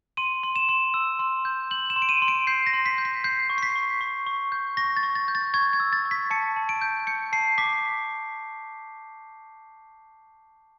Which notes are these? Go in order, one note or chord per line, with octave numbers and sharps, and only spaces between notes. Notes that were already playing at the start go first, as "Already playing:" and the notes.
C6 D#7
C6
E7
C6
E6
C6
G6
G6 F#7
E7
C6
D7
D#7
C6
D7
G6 C7
A#6
C6
B6
G6
B6
G6 C7
C#6
C7
B6
C#6
C#6
C#6
G6
C#6 A#6
A6
C#6
A6
G6
A6
C#6 G#6
G#6
E6
A6
C#6
B6
A5 C#7
A5
D7
G6
G6 C#7
A5 C7
D6 B6